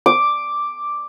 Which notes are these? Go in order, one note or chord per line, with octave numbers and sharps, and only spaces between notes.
D6